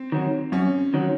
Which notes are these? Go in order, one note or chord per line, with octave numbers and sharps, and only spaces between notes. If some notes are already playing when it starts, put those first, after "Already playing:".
Already playing: C4
D#3 F#3
F#2 C#4
D#3 F#3